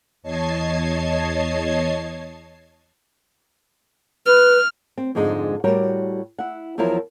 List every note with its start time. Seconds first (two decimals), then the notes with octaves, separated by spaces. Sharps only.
0.22 E2 C#5 D#5 A5 G#6 C7
4.27 B4 F6
4.97 C4
5.15 F2 G#2 D3 G#3 D#4
5.64 A2 G3 F#4 A#4 C#5
6.38 E4 F#5
6.78 E2 F3 F#3 E4 A#4